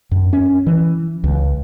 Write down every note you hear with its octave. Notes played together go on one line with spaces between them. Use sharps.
F#2
C#4
E3
C#2